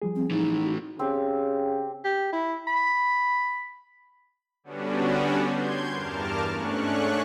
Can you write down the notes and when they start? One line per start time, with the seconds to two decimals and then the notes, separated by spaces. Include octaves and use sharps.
0.02 F3 G3 G#4
0.16 C4
0.31 A2 E3 D#4
0.67 F#4
0.99 C#3 C4 G4
2.04 G4
2.33 E4
2.68 B5
4.64 D3 G3 B3 C#4 D4 F#4
5.44 C6 G6 G#6
5.90 E2 G2 A#4 A5 D6 F6
6.50 G#2 A3 C#4 D4 C#6 F#6